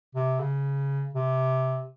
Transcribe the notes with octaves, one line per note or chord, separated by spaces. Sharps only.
C3
C#3
C3